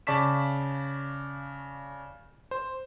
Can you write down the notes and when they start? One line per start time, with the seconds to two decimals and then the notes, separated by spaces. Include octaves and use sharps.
0.07 C#3 D5 A5 C#6 B6 E7
2.51 C5